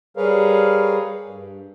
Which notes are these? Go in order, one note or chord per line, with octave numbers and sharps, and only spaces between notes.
G3 G#4 A#4 B4 C#5 F5
G2